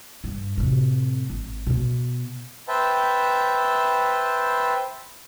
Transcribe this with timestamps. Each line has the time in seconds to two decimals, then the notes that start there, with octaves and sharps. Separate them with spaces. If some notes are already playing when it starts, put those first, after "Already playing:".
0.24 G2
0.58 A2 C3
1.30 G#1
1.67 B2 B3
2.68 B4 C5 E5 G5 A5